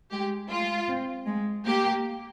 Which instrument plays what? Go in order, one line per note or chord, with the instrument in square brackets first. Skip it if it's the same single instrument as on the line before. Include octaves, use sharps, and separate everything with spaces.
[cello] G#3 [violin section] G4
[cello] G#3 [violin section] F4
[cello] C4
G#3
[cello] A#3 [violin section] G4